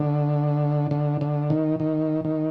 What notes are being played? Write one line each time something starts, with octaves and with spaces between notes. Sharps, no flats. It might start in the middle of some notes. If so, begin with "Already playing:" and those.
Already playing: D3
D3
D3
D#3
D#3
D#3